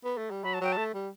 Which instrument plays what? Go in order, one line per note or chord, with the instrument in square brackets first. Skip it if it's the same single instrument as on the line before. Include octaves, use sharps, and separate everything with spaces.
[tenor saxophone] B3
A3
G3
[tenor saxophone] F#3 [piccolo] B5
[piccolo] A5
[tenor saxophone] F#3 [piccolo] G5
[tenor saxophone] A3 [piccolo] A5
[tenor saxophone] G3